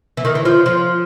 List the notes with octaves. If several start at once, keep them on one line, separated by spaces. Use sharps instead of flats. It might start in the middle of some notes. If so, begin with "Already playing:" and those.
E3
D#3
E3
F3
F3